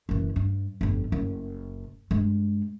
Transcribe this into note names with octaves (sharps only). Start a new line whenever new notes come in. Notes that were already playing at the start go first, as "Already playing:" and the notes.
F#1 E3
G2
G1 F2
F#1
G2 G#3